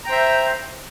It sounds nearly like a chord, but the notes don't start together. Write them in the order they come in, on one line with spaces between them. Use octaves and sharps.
A#5 G5 C5 E5